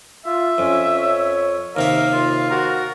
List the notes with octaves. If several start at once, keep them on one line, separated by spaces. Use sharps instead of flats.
F4 E5
F2 C#4
C#5
D#2 C3 A#4 E5 F5
F4
F#4 A#4